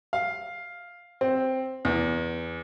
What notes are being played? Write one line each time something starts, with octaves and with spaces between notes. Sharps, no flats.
F5
C4
E2